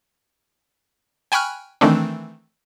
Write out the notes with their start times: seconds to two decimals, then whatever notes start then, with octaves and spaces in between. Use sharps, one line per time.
1.32 G5 G#5 B5 C#6 F6 F#6
1.81 D#3 E3 A3 C4 D4